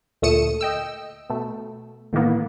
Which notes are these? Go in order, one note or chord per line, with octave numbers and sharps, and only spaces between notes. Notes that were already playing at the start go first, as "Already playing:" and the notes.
D2 A#2 A3 D#6 C#7 E7
D#5 G5 E6
B2 A3
A2 D#3 E3 A#3 B3